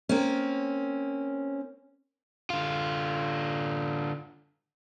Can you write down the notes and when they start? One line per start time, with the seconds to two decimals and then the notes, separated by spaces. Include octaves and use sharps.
0.09 A#3 C4 C#4
2.50 D3 F4